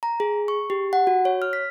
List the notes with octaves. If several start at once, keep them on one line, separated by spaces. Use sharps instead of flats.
A#5
G#4
C#6
G4
F#5
F#4
C#5
F6
B6